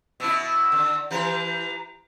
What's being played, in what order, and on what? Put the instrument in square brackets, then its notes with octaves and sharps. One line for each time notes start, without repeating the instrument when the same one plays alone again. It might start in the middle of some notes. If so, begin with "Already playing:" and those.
[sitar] B2 E4 [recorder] E6
[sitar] D3
[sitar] E3 G4 B4 [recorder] A#5